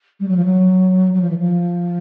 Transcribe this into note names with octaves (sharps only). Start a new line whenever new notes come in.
G3
F#3
F3
F#3
F#3
F3
E3
F3